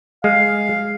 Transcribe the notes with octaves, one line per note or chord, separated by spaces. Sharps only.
G#3 F5